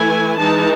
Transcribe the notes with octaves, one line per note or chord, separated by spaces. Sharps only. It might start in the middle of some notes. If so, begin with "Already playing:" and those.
Already playing: E3 A3 E4 G#5
E3 G#3 D#4 A5